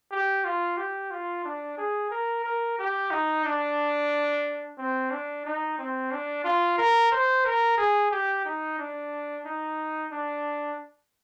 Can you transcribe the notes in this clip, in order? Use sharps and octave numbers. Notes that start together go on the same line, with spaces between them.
G4
F4
G4
F4
D4
G#4
A#4
A#4
G4
D#4
D4
C4
D4
D#4
C4
D4
F4
A#4
C5
A#4
G#4
G4
D#4
D4
D#4
D4